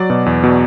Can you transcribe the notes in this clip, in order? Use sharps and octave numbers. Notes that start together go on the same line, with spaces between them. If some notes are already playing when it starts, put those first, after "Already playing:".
Already playing: F#3 D5
B2
E2
B2